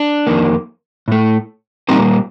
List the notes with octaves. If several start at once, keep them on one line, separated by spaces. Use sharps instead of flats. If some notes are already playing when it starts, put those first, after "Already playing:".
Already playing: D4
F2 D#3 A#3
A2 A3
A#2 G3 A#3 C4 D#4